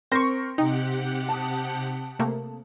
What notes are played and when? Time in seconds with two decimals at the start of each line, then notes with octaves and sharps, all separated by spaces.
0.12 C4 A#4 C5 C6 C#6 A#6
0.58 C3 D#4 G4 F#5 G5
1.29 A5 D#6
2.19 C3 A3 A#3